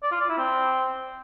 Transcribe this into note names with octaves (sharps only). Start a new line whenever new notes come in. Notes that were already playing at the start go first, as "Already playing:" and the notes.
D5
F4
D5
E4
C4